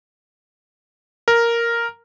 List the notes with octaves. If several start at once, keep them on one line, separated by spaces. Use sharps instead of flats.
A#4